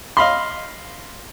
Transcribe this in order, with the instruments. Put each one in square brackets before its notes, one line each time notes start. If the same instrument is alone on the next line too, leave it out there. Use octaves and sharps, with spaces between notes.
[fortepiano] D#5 F5 B5 C6